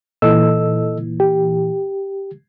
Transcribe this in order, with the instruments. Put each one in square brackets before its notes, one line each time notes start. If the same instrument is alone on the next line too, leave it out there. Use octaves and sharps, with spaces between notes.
[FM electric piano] A#2 E3 [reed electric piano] A4 D#5 E6
[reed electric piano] G4